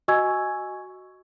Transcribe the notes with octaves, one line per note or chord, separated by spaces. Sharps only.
F#4 D#5 G#5 C#6 E6 G#6